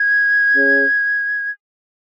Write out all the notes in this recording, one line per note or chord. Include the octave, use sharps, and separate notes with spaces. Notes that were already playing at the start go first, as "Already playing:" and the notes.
Already playing: G#6
C#4 G#4 C#5